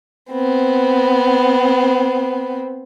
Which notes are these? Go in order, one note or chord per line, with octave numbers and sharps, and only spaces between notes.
B3 C4